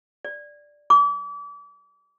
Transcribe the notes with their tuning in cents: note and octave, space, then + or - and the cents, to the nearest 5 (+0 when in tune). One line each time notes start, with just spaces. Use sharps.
D5 +0
D6 -35